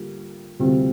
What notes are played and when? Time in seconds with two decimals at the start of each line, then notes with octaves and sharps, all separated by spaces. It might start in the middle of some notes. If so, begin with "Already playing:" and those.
Already playing: D3 G3 A#3 F4
0.59 D2 C3 G3 C4 F4